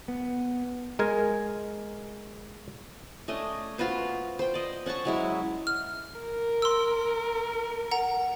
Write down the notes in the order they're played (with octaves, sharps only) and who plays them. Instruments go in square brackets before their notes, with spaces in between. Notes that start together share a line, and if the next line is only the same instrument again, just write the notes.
[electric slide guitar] B3
[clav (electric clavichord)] G#3 A#4 G#5
[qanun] A3 C#4 D4 D#5
F4 F#4 B4 C5
C5 G5
D5 D#5
C#4 F#5 A5 C#6
F#3 G#3 E4
[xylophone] F6
[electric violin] A#4
[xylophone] C6 E6
F#5 A#5